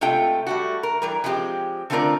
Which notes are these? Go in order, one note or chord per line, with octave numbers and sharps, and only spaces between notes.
C3 G#3 A3 F4 G5
G3 A3 F#4
A#4
E3 G3 A#4
F3 G#3 C4 F4 G4
D3 A3 C4 F4 A#4 D5